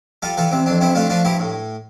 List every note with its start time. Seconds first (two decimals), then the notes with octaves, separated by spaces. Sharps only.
0.22 G3 F4 A4
0.37 E3 F4 A4
0.51 C3 C4
0.66 F2 D4
0.81 G2 C4 E4
0.95 A3 D4 F4
1.10 F3 D4 F4
1.25 G2 E4 G4
1.39 A2